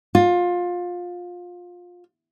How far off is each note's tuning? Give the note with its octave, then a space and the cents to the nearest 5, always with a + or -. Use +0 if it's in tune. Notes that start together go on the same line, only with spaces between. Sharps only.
F4 +20